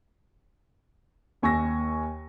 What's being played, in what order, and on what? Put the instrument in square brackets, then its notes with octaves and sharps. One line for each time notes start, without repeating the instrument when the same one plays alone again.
[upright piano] D#2 G#5 C#6 E6 A#6